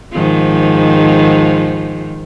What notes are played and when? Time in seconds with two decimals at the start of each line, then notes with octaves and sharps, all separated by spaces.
0.13 G#2 D#3 F3